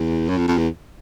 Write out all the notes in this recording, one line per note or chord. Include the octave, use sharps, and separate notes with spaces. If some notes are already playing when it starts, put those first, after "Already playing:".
Already playing: E2
F#2
F2
F2
E2